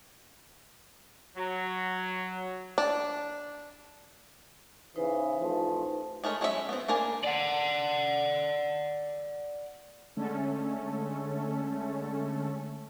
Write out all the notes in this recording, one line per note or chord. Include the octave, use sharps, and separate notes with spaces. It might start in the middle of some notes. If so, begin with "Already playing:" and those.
F#3
D4
C#3 E3 D#4 B4 C5
A1 F3 A3
G#3 A3 A#4 C#5
F#3 G#3 C#4 D4 E5
B3 C4
A#3 D4 A#4 C5 G#5
D5 F#5
D3 G#3 A3 C#4 A4